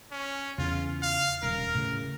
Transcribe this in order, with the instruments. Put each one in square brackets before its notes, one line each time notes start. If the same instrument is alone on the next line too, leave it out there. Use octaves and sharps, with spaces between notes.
[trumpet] C#4
[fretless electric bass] E2 C#3 [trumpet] F4
[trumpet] F5
[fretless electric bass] D#1 [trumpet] A#4
[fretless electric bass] A2 C#3